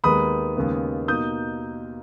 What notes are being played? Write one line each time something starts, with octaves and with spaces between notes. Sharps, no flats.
D#2 D#3 G#3 B3 B5 D#6
D#2 C#3 G#3 B3
B2 A#3 D#4 D#6 G6